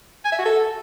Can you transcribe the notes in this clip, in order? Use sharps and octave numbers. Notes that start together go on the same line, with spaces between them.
G#5
E5
F#4
A4